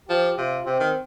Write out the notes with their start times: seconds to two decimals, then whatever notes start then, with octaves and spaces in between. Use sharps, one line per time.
0.09 F3 G4
0.38 C3 F4
0.66 C3 C4
0.80 D#3